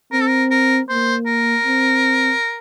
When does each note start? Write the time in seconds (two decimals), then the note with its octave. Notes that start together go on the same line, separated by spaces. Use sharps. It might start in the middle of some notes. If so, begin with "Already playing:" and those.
0.12 C4 A#4
0.21 A4
0.28 A#4
0.51 A#4
0.89 A#3 C5
1.27 A#4
1.65 C4